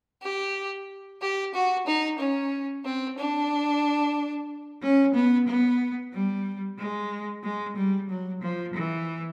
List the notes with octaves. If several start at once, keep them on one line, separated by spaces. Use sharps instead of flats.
G4
G4
F#4
D#4
C#4
C4
D4
C#4
B3
B3
G3
G#3
G#3
G3
F#3
F3
E3